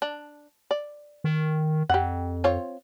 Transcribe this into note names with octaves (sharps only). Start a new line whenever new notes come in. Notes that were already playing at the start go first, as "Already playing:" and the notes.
D4
D5
D#3
F2 G4 F#5
C4 F4 C#5